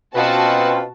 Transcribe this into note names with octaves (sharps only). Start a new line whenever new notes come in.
B2 C4 C#4 F4 F#4 B4 A5